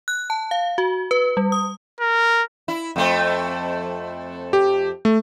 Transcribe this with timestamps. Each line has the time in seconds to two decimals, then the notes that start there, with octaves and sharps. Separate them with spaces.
0.08 F#6
0.30 A5
0.51 F5
0.78 F#4
1.11 B4
1.37 G3
1.52 D#6
2.00 A#4
2.68 E4
2.96 F2 A3 C4
4.53 G4
5.05 A3